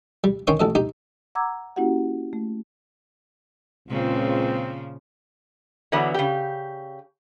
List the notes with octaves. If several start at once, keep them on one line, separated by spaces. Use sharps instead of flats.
G3
D#3 C#4 G5 C6 C#6 D#6
A1 A4 D#5
D#4 G4
F#5 A#5 D6 E6 G#6
A#3 C#4 E4 F#4 G4 F#5
A3
C#2 A#2 C#3 F3 C4
D3 E3 F#3 B3
C#3 G4